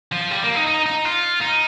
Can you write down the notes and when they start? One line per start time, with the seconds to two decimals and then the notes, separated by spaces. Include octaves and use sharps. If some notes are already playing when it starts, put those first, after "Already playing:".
0.12 F3
0.31 G3
0.43 A#3
0.56 D#4
0.67 D#4
0.86 D#4
1.05 F4
1.42 D#4